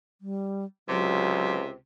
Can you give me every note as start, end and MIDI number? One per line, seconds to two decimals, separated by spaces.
0.21 0.65 55
0.88 1.71 37
0.88 1.76 48
0.88 1.56 54